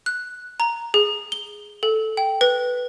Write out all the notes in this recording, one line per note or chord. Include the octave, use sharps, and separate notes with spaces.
F#6
A#5
G#4
G7
A4
G5
B4